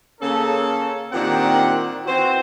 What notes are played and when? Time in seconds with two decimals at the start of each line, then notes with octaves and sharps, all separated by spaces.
0.20 C#3 A#3 C#4 A4
1.12 A#2 D#3 C4 D4 G4 F#5
2.05 E3 C4 F#4 C5